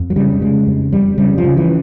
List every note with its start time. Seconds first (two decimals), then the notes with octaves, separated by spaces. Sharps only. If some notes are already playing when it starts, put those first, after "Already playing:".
Already playing: F2
0.10 F#3
0.16 C#3 G3
0.41 C#3 G#3
0.67 F2
0.92 F2 G3
1.18 C#3 G3
1.38 F3
1.44 C#3
1.57 E3